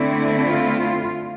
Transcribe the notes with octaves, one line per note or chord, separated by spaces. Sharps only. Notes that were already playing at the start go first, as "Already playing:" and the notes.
Already playing: D3 A3 C4 E4
F4